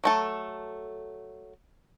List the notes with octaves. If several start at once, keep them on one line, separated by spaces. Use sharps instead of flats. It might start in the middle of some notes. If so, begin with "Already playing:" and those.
F#3 A3 A4